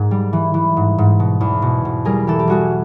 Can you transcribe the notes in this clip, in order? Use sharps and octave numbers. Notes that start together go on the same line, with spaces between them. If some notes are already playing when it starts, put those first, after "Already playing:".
Already playing: G#2 G#4 A#4
G3
E3
E3
G#2
G#2
B2
E2
B2
B2
G3 G#4 A#4
E3 G4 A4
G4
G3 F#4 G#4